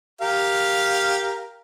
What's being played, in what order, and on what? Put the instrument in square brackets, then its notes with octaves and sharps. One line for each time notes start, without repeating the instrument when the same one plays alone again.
[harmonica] G4 A#4 F5